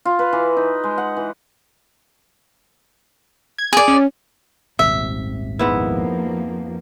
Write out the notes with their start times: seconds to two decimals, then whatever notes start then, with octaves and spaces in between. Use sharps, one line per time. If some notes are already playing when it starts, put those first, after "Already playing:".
0.05 F4
0.19 B4
0.33 E3
0.57 D#4
0.84 G#3
0.98 F#5
1.17 E3
3.58 G#6
3.73 G#4 D5
3.88 C#4
4.79 D#1 G#1 C3 E5
5.59 F2 G#2 F3 A#3 B3 E4